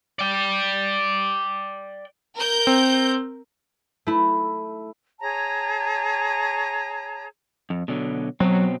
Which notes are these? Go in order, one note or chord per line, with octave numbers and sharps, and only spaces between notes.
D5 G5
A#4 G6
C4
A3 E4
G#4 C#5 A5 A#5
F2
B2 D3 F#3
B2 F#3 C4